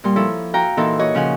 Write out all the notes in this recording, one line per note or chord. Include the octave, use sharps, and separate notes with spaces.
A#2 G3 C6
F3 E4 A4 C#5
F#4 F5 G5 A#5
A#2 E3 D#4 A4 C6
F#4 C#5 D#5 C#6
C#3 F3 F5 F#5 G#5